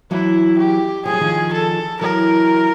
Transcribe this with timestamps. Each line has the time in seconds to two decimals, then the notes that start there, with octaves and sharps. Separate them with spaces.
0.11 E3 F#3 E4
0.58 G4
1.05 F3 G#4
1.13 F#3
1.21 D#3 F3
1.53 A4
2.01 E3 F#3 A#4